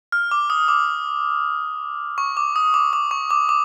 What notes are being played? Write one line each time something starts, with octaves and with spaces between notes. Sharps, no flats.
F6
D6
D#6
D6
C#6
D6
D#6
D6
D6
C#6
D6
D6